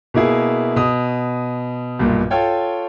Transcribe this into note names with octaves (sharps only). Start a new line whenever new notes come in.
B2 A#3 E4 G#4
B2 D#6
B1 G2 A#2
F4 A4 C#5 G5